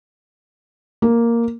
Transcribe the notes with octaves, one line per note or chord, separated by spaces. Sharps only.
A#3